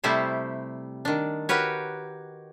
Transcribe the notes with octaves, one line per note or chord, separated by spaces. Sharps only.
C3 G3 A3 E4 G4 C5
D#3 D4
F#4 G4 A#4 B4 C#5